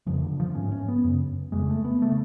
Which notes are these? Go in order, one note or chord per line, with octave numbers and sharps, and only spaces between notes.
F2 C#3 F3
D3
F3
G#2 C#4
C#4
B3
F#2 C#3
F2 C#3 G#3
A3
B3
C#3 A3